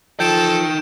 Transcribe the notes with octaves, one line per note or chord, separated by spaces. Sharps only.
F3 D#4 A4 G5 G6 D7 E7